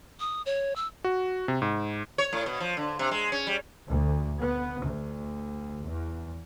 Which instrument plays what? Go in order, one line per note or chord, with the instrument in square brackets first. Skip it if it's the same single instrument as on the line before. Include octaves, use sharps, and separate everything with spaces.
[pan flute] D#6
C#5
E6
[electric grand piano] F#4
C3
G#2
[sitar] C#5
A2
B2
F3
D3
C3
G#3
C#4
G3
[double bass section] D2
B3
D2
E2